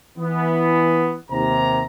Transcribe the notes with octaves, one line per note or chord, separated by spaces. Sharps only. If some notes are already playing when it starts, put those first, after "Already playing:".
E3 B3
D#2 C3 A#5